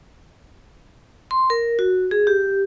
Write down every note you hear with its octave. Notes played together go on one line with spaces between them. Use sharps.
C6
A#4
F#4
G#4
G4